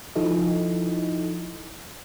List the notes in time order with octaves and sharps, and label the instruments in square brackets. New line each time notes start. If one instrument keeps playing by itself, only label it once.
[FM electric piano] F3 D#4 E4 A4 D#5